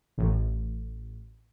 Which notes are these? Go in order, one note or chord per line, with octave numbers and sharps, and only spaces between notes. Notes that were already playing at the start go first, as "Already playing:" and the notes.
A1